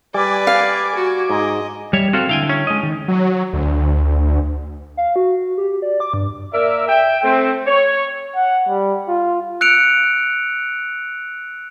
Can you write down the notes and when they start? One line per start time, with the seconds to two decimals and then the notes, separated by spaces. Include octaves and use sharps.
0.14 G3 B4 D5 G#5 D6
0.47 F5
0.95 F#4
1.30 G#2 D#5
1.93 G3 C#5 E5
2.13 C4 F#4 A4 F5
2.29 D3 E4 F5 G5 G#5
2.49 C#4
2.67 G#3 D#5
2.83 D#3
3.08 F#3
3.53 D2
4.97 F5
5.16 F#4
5.58 G4
5.82 D5
6.00 D6
6.14 G2
6.53 A#3 A#4 D5 E5
6.88 E5 G5
7.23 A3 C4
7.66 C#5
8.35 F#5
8.69 G3
9.08 F4
9.61 E6 F#6 C#7 D7 F7